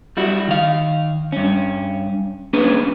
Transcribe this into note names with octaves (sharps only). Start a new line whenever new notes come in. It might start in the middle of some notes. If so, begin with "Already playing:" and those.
G3 E4 F#4
D#3 F5
G2 C#4
A#3 C#4 D4 G#4 B4